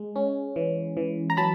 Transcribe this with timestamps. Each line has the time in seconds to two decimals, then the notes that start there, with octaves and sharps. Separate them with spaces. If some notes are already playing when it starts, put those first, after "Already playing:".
Already playing: G#3
0.16 C#4
0.56 E3
0.97 E3
1.30 A#5
1.37 F#3 A5 B5